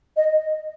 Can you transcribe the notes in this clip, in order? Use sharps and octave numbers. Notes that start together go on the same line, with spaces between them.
D#5